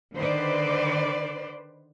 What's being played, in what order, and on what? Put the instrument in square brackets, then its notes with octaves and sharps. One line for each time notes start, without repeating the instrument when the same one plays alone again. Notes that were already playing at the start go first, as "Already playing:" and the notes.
[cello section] D3 D#3 B4 C5 D5